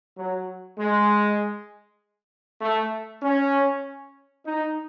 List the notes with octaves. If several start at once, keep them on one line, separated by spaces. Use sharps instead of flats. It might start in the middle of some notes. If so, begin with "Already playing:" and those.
F#3
G#3
A3
C#4
D#4